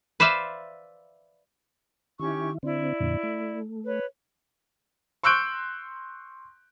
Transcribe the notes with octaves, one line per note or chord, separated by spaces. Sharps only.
B4 C5 D5 E5 F5
D#3 C#4 E4 G4 C#6
D3 C4 E4 D5
F2 A#2 D3
A3
B4 C#5
C6 C#6 E6 F#6 G6 D7